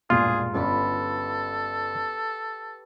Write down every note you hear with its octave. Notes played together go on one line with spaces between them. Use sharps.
E1 G2 A#2 F4 G#4
G1 C#4 G4 A4 B4